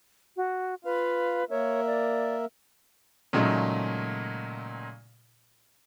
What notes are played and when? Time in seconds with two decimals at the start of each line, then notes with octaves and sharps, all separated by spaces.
0.36 F#4
0.85 F4 B4 F5
1.50 A#3 A#4 C#5 E5
1.87 D5
3.33 A#2 C#3 F#3 G#3 A3 D#4